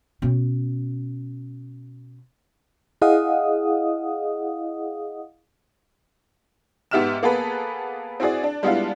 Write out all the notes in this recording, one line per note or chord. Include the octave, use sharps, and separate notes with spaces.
B2 C#4
E4 G#4 D#5 F5 F#5 D#6
G#2 B3 G4 E5 F6 E7
A#3 B3 G#4 A4 B4
C4 E4 F#4 G#4 D5
D4
G3 G#3 B3 D4 E4 F4